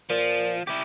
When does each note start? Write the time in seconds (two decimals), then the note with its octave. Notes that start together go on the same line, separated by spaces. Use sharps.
0.10 A#2 F3
0.67 E4 G4